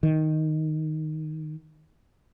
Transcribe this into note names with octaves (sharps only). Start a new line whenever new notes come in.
D#3